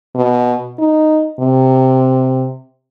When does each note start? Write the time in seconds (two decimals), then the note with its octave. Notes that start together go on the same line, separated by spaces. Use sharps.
0.15 B2
0.79 D#4
1.40 C3